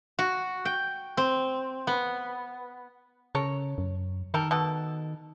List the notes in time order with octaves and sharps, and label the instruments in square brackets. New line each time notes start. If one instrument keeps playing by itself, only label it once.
[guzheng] F#4
G5
C4
B3
[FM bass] C#3 [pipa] A4 A#4 C#5
[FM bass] F#2
[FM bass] D#3 [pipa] G3 A4 A#4
[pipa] B2 A4